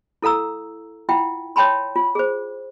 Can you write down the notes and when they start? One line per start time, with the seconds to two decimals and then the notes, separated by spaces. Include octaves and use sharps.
0.22 E4 A4 F5 A#5 E6
1.09 E4 F4 E5 F#5 G5
1.56 C#5 E5 G5 A5 B5 C6
1.96 F4
2.15 G#4 C5